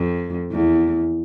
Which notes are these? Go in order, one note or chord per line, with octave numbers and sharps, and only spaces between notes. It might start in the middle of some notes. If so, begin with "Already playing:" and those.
Already playing: F2
E2